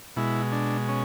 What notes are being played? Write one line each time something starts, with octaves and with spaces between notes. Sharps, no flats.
B2 G#3 E4
D4
C#4